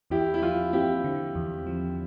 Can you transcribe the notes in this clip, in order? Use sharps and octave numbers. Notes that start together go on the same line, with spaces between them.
E2 E4 G4
E4
F3 F4
C4 E4 G4
D3
E2
F3